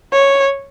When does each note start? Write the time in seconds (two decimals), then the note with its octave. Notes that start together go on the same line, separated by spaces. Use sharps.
0.13 C#5